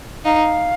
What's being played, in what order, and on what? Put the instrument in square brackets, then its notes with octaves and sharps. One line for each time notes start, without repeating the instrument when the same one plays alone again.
[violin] D#4 [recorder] F5